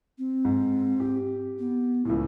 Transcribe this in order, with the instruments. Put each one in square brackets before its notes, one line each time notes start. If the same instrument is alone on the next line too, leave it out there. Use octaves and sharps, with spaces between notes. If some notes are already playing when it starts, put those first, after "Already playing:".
[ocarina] C4
[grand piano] G#2
G4
[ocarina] B3
[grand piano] C#2 A2 [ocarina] E4